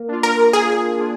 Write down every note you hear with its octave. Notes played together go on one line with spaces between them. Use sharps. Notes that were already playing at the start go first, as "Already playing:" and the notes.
Already playing: A#3
D4 F4
A#4
A#3 G#4
D4 F4